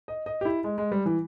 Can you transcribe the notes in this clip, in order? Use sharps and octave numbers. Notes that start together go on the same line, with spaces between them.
D#5
D#5
G4
E4
G#3
G#3
G3
E3